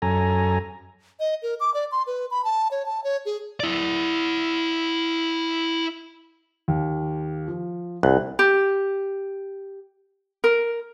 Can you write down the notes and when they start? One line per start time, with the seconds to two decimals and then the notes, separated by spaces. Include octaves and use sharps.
0.02 F#2 A4 G#5 A#5
1.20 D#5
1.43 A#4
1.60 D6
1.74 D5
1.92 C6
2.07 B4
2.31 B5
2.45 A5
2.71 C#5
2.86 A5
3.04 C#5
3.26 G#4
3.60 E4 D5
6.68 D#2
7.48 F3
8.03 C2 F#6
8.39 G4
10.44 A#4